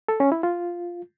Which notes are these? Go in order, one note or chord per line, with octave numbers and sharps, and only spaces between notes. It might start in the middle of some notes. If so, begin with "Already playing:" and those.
A4
C#4
E4
F4